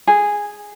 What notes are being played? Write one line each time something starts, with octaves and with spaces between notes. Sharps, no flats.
G#4